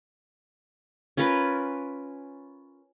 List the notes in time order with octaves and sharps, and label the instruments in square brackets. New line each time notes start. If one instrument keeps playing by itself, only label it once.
[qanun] C#4 F4 A#4 B4